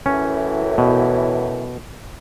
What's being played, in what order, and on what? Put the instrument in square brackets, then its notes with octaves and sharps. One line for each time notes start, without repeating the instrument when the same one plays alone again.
[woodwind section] F#2 A2 E3 [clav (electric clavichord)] C#4
[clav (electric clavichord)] B2